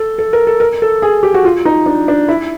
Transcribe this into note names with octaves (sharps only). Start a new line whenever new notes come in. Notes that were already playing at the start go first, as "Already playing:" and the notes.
Already playing: A4
A4
A#4
A4
A#4
A4
G#4
G4
F#4
F4
D#4
D4
D4
E4